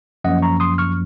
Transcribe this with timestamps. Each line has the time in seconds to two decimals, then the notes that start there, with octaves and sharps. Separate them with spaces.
0.24 F#2 F3 A#3 D#5 F#5
0.42 A#5 C#6
0.60 C6 D#6
0.78 C#6 F6